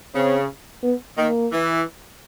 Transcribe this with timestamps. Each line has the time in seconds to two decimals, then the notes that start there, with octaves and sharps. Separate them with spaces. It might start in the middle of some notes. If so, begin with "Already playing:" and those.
0.14 C#3 C4
0.83 B3
1.17 D#3 A#3
1.51 E3